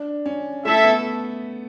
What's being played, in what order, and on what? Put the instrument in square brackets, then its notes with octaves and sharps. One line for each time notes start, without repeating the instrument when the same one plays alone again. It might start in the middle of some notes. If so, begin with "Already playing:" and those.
Already playing: [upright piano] D4
C#4
[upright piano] A3 [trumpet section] E4 A4 E5
[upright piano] B3